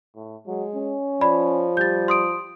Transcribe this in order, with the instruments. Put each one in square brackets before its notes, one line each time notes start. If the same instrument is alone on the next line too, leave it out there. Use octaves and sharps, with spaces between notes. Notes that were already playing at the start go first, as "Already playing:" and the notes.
[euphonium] A2
[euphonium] F#3 [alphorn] G#3
[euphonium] C#4
[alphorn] F3 [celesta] D5 B5
[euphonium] G3 [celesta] G6 A6
[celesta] C6 D#6 D7